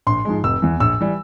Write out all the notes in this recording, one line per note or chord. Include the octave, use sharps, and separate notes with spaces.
A#1 C6
G#2 F3 G#3
F1 E6
E2 E3
A#1 E6
E3 G3